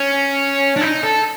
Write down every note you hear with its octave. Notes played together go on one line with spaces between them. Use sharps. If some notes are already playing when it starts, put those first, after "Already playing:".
Already playing: C#4
D4
D#4
A4